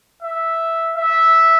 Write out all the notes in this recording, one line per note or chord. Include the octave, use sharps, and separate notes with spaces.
E5
E5